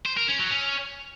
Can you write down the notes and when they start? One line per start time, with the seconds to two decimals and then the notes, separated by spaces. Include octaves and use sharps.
0.06 C5
0.17 A#4
0.28 C#4
0.40 F#3
0.51 C#4